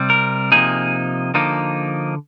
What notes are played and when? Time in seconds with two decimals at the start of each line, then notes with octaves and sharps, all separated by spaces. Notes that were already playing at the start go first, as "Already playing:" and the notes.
Already playing: C3 G3 C4
0.10 A#4
0.52 C3 F3 A#3 D#4 G#4
1.34 D3 F3 A#3 D#4